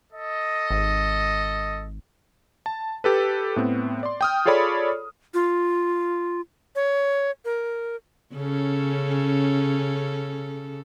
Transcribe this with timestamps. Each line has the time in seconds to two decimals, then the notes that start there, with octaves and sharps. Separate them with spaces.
0.11 A4 D#5
0.70 G#1
2.66 A5
3.04 G4 A4 B4
3.56 A2 B3 C4
4.03 D5 C6
4.21 G5 D#6 F6
4.45 F4 G#4 A4 C#5 D5 B5
5.34 F4
6.76 C#5
7.45 A#4
8.34 C#3 C#4 A4